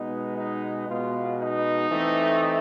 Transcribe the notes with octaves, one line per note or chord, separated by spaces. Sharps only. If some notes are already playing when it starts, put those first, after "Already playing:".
Already playing: B2 G#3 B3 D#4
D#4
B2 G#3 B3 F4
D#4
E3 A3 C4